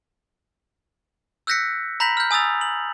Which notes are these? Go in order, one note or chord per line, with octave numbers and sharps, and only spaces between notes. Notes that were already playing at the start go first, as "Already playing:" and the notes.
E6 F#6 G6 A#6 B6 C#7
A#5 B5 G6 A#6 B6 F#7
F6 G6
G#5 D#6 E6 A6 F7
F#7